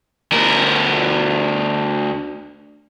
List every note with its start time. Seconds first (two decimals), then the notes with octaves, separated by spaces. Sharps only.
0.32 D2 A#4